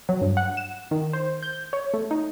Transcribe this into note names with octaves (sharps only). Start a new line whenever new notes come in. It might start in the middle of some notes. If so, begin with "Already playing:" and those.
F#3
G2
F#5
E7
D#3
C5
G6
C#5
A3
D#4